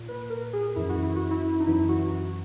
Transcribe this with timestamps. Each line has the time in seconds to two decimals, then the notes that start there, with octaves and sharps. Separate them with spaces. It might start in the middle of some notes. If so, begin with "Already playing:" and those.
Already playing: A#2
0.08 B4
0.30 A#4
0.53 G#4
0.76 F#2 E3 E4
0.89 F#4
1.03 E4
1.16 F#4
1.31 E4
1.60 D#4
1.67 F#2 E3 E4
1.89 F#4
2.12 F#4